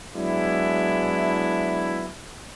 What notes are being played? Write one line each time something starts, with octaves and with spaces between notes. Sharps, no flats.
F#3 G#3 B3 D4 E4